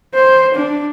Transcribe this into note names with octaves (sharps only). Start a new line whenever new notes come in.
C5
D4